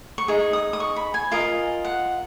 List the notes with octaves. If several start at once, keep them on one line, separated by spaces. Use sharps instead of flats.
C#6
D#4 G#4
D#6
D#6
C#6
B5
G#5
F4 A#4 D#5
F#5